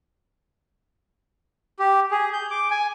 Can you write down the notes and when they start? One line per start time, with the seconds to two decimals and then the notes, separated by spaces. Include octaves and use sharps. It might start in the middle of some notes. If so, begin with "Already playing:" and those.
1.80 G4
2.11 G#4
2.33 G6
2.51 D6
2.71 G#5